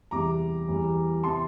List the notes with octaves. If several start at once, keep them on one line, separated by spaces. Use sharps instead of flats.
E2 C3 G3 A#5 D6
E2 E3 G3
C3 E3 A5 C6